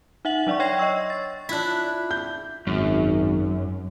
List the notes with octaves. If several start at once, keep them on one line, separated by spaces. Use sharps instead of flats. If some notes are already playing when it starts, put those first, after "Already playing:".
D#4 E5 F#5 F#7
F#3 D4 D5 F#5 C#6
C#5 G5 C6 G#6 A#6 C7
C#5 D#5 C#6 E6
A6
D4 E4 F4 F#6 B6
G6
G#1 F#2